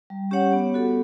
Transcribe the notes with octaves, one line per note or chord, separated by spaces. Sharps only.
G3
C#4 G4 C#5 F#5
B3
F#4 A4